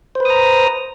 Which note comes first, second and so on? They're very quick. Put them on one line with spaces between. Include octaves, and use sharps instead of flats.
C5 B4 D#6 A#5